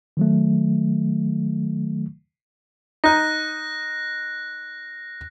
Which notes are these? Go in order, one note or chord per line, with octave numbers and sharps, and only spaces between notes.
D#3 F#3 A3
D#4 F#6 A#6